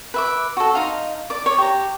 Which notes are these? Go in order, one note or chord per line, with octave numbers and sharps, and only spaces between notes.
B4 E5 D6
F#4 A4
D#4 F5 C6
D5 D6
C#5
G4 A#5